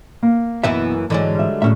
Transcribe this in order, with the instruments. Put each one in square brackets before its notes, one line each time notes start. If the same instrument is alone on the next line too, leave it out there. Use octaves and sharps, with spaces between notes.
[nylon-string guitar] A#3
[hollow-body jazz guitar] B1 B3 E5 [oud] F#2 E3 E4
[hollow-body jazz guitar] G#2 E3 [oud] D3 F#3 G#3
[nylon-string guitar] G3 E5
[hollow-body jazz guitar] B1 C#4 E5 [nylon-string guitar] A2